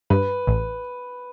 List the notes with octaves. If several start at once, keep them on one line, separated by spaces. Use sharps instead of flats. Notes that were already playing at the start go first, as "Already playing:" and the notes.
G2 B4
A1